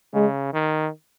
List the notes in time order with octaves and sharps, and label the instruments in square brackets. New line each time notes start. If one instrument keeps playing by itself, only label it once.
[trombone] C#3 [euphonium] G#3
[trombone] D#3